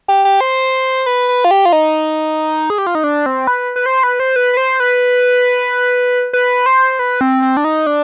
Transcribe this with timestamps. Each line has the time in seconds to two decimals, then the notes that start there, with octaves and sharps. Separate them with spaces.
0.08 G4
0.25 G4
0.41 C5
1.06 B4
1.29 B4
1.44 F4
1.51 G4
1.65 F4
1.73 D#4
2.70 G#4
2.78 G4
2.87 F4
2.95 D#4
3.04 D4
3.26 C4
3.47 B4
3.76 B4
3.86 C5
4.03 B4
4.20 C5
4.36 B4
4.53 B4
4.57 C5
4.80 B4
6.33 B4
6.66 C5
6.99 B4
7.21 C4
7.42 C4
7.57 D4
7.64 D#4
7.87 D4